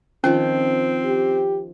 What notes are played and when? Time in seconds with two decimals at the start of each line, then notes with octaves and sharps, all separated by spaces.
0.24 D#3 F3 C4 C#4 G5
1.05 G4